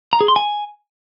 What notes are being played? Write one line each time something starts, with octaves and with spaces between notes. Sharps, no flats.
A#5
G#4
C6
G#5